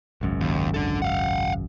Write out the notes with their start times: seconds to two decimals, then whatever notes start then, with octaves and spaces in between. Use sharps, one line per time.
0.21 G#1 C#2 F#2
0.40 D#2
0.74 D4 A4
1.02 F5 F#5